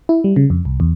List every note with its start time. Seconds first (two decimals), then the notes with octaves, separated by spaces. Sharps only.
0.09 E4
0.24 G3
0.36 C#3
0.50 F2
0.65 C2
0.80 E2